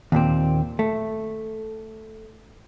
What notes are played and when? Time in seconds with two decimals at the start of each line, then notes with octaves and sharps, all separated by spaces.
0.12 D#2 A#2 C4
0.79 A3